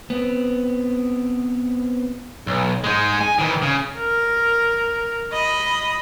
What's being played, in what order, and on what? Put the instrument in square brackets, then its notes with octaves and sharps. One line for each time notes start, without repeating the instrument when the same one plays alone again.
[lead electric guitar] B3 C4
[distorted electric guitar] B1
G#3 D#4
G#5
D#3 E3
C#3
[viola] A#4
D#5 B5